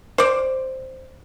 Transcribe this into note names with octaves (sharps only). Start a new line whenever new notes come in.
C5 D5